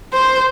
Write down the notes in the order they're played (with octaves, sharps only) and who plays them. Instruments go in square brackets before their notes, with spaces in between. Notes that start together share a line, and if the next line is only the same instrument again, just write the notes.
[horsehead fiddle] C5